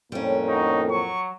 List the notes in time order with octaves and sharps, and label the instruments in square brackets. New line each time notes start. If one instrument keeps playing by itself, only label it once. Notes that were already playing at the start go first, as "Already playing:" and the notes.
[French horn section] F2 A2 A#3 [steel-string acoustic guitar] G3 C#4
[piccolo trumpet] D#4 [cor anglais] F#4
[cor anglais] F#3 [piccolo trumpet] C#6